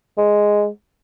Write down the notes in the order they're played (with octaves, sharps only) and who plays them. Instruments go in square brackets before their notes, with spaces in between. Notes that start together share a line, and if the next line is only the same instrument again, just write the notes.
[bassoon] G#3